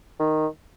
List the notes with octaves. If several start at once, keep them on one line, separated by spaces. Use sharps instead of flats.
D#3